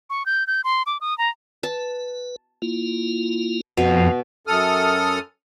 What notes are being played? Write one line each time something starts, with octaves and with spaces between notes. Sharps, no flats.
C#6
G6
G6
C6
D6
D#6
A#5
B4 A5
A#3 E4 F4
F2 B2 F3
F#2 A4 D#6 F6